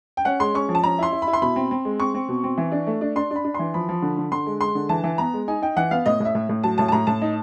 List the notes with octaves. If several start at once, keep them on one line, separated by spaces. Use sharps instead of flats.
G5
C#4 F#5
G#3 C6
C#4 C#6
F3
A5
C#4 A#5
E4 C6
E4
B5
E4
C6
B2 B5
C4
C4
G#3
C4 C#6
C4
B2
C4
E3
D4
A3
D4
D4 C6
D4
B5
D4
E3 C6
F3 B5
F3
D3
D3
D3 C6
G#3
G#3 C6
D3
E3 A5
E3
B3 A#5
G#3
D#4 G#5
D#4 G5
E3 F#5
B3 F5
A2 D#5
A2
E5
A2
A2
F#3 A5
A2 A5
A5
A2 A#5
A2 A5
D#4